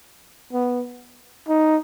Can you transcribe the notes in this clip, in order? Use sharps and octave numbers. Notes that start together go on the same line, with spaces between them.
B3
D#4